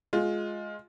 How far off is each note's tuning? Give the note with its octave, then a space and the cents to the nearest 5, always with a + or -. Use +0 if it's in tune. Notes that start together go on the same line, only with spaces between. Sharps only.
G#3 +15 F4 +15